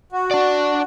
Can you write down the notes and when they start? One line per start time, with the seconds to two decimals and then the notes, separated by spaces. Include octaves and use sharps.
0.12 F#4
0.31 D4 D5